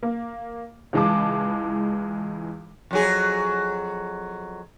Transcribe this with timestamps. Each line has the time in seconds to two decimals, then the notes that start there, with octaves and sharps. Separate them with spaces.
0.03 A#3
0.93 C#2 E3 G#3 A5 D6
2.91 F2 F#3 G#4